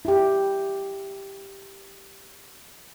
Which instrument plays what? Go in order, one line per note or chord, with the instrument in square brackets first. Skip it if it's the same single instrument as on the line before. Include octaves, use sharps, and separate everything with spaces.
[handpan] E4 G4